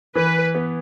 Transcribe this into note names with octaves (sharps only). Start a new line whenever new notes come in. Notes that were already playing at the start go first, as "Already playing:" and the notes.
E3 B4
B3